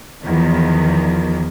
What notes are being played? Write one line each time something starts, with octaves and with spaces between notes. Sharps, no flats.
E2 D#3 F3